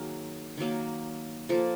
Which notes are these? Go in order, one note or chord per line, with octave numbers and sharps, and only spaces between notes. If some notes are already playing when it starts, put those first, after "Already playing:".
Already playing: D#3 F#3 A#3 G#4
D#3 F#3 A#3
F3 A#3 A4